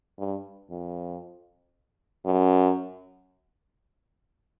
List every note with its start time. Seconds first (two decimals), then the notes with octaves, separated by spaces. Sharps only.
0.19 G2
0.70 F2
2.25 F#2